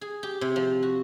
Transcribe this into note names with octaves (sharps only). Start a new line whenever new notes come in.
G#4
G4
C3
F3
F#4